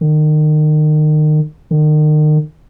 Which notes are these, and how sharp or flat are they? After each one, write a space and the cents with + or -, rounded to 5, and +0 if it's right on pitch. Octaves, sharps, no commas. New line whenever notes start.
D#3 -30
D#3 -35